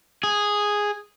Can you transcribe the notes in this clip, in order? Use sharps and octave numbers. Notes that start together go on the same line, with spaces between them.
G#4